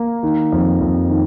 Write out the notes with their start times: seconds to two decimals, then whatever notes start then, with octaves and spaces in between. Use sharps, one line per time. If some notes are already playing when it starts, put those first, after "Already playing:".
Already playing: A#3
0.23 D#3
0.52 F2
0.81 F2
1.10 D#3